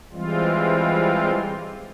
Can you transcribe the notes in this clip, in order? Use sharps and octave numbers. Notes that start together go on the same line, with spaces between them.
E3 G3 G#3 C4 F4